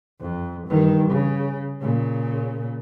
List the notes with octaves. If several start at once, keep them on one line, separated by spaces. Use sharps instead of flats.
F2
G2 D#3
C#3
A#2 C#3